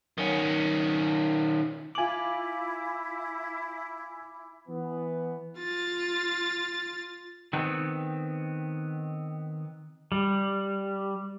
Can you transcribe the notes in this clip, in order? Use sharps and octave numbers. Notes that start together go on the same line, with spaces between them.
D#3 C#4
E4 F4 G#5 D6 F#7
E3 B3
F4 A6
D#3 B3 C4
G3